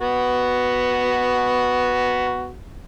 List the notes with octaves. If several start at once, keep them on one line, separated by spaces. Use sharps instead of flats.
B3 F#4